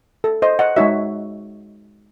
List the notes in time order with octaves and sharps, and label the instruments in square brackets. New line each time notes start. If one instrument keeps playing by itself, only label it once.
[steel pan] A4
C5 D#5
D#5 F#5
G#3 D#4 F#4 C#5 E5